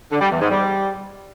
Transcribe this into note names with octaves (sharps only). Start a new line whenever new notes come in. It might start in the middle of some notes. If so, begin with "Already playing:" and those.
D3
G3
E2
G#2
G3